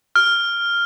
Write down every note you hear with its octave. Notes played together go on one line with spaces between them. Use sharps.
F6